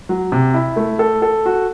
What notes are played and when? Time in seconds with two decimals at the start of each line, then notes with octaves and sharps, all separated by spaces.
0.09 F#3
0.32 C3
0.54 E4
0.76 A3
0.99 A4
1.22 A4
1.46 F#4